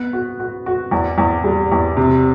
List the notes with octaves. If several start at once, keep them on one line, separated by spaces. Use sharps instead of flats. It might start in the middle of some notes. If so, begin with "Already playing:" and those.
Already playing: B3
F#4
F#4
F#4
E2
E2
G3
E2
C3